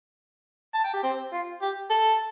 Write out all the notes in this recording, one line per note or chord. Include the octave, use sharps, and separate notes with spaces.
A5
G5
G4
C4
F4
G4
A4